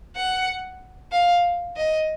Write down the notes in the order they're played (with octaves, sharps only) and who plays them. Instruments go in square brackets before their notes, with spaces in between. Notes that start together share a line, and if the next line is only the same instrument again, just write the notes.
[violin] F#5
F5
D#5